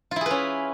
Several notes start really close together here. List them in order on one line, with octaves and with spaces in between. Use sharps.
F4 E4 G#4 B4 C#4